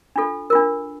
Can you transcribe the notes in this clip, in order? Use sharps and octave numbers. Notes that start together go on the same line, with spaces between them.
D4 F4 A4
D4 F4 A#4